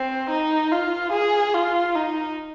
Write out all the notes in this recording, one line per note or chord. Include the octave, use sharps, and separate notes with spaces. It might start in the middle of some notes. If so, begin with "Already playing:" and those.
Already playing: C4
D#4
F4
G#4
F4
D#4